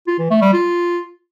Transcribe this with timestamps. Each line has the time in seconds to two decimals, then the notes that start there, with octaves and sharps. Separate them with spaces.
0.07 F4
0.19 E3
0.30 A3
0.42 G3
0.53 F4